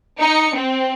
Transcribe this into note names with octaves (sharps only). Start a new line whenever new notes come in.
D#4 C#7
C4